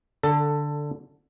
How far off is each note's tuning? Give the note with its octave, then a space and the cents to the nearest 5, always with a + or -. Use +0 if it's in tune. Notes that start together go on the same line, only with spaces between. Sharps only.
D3 +0 A4 +15